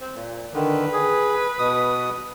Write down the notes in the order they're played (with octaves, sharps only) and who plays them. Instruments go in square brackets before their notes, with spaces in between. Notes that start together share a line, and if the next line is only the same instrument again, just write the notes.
[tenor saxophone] C4
A#2
[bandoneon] D3 D#3 [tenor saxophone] B4
[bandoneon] G#4
B2 D#6